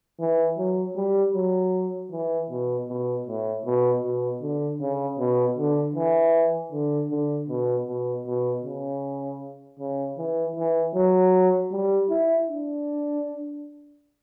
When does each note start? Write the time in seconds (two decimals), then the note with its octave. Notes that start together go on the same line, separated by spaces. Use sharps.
0.20 E3
0.58 F#3
0.97 G3
1.35 F#3
2.11 E3
2.50 B2
2.89 B2
3.27 A2
3.65 B2
4.04 B2
4.41 D3
4.81 C#3
5.19 B2
5.57 D3
5.96 E3
6.72 D3
7.11 D3
7.49 B2
7.87 B2
8.26 B2
8.64 C#3
9.79 C#3
10.18 E3
10.56 E3
10.95 F#3
11.72 G3
12.09 E4
12.48 D4